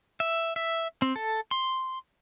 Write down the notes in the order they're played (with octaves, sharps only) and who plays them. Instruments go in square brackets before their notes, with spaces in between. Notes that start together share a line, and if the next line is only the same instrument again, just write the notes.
[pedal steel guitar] E5
E5
C4
A4
C6